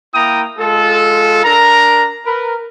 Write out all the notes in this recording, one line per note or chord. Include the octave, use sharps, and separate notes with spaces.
A#3 E4 G5 A#5 D#6
G#3 F4 A4
D4 A#4 A#5
A#4 B4